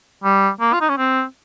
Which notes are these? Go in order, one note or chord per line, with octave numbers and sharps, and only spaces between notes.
G3
A#3
F4
D#4
C#4
C4